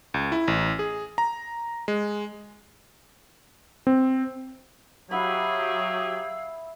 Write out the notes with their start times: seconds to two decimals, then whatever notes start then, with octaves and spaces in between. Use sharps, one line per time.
0.14 C#2
0.32 E4
0.48 A1
0.79 G#4
1.18 A#5
1.88 G#3
3.87 C4
5.11 F#3 E4 G4 G#4 F5 F#5 B5 E6